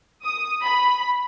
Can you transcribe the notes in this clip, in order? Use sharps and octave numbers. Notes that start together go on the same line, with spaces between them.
D#6
B5